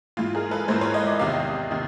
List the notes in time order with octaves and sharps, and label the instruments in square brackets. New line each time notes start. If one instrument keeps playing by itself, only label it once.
[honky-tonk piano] G#2 E3 F4
G#4 A#4
A4 B4
G#2 E3 A#4 C5
B4 C#5
C#5 D#5
D5 E5
E2 C3 D#3 D#5 F5
C3 D#3